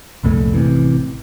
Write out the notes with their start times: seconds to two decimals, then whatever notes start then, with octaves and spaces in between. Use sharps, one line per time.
0.23 C2 F2 A#2 A3
0.53 A1 C3 E3